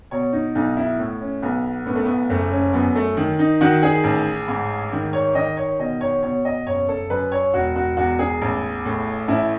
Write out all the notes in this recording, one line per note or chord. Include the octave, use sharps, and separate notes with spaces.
B2 C#5
D#4
B1 D#4
E4
A2
C#4
B1 B3
A2 B3
A3
B3
F#1 A3
C#4
F#2 B3
A3
D#3
D#4
D#3 F#4
G#4
A1
G#2
D#3
C#5
D#3 D#5
C#5
B2 D#5
C#5
B2 C#5
D#5
F#1 C#5
A4
F#2 B4
C#5
E1 F#4
F#4
E2 F#4
G#4
A1
A2
A1 E4